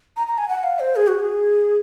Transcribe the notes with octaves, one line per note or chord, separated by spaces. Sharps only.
A#5
A#5
G#5
F#5
F5
C5
G#4
F#4
G#4